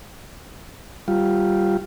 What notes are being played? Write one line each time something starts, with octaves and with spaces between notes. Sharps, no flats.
G3 F4